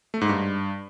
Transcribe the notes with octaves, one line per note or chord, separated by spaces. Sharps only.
A3
G#2
G2